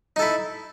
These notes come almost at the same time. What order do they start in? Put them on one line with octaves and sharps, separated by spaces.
D#4 A4 E4